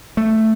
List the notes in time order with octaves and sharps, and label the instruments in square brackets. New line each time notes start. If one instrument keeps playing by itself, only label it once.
[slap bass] A3